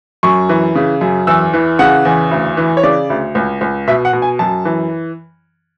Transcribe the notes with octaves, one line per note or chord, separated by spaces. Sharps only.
F#2 C#6
E3
C#3
F#2
E2 E6
E3
C#3 F#5
E2
D2
E3
C#5
C#3 D5
D2
C#2
C#2
B2 E5
F#5
B2
G#5
F#2 A5
E3